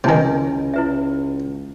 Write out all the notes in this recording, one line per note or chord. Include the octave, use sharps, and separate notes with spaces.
C#2 C3 D#3 D#4 E4 G#5
E4 B4 E5